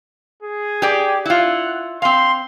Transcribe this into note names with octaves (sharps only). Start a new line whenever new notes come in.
G#4
G4 D5
E4 F4 F#5
C4 F5 C6